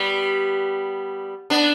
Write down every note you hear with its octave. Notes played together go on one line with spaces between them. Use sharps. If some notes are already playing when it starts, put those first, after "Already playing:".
Already playing: G3 B3
B3 D4